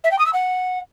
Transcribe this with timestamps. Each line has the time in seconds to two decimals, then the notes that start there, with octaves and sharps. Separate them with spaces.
0.04 E5
0.11 G5
0.19 D#6
0.26 E6
0.33 F#5